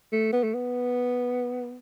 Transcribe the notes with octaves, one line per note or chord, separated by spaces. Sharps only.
A3
B3
A3
B3